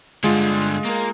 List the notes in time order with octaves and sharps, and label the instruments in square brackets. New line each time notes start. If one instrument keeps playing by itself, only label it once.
[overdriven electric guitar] G2 D3 [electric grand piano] G#3 F4
[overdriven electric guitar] A#3 A#4